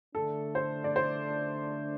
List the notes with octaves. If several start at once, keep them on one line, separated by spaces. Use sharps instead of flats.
D3 A3 D4 A4
C5
D5
C5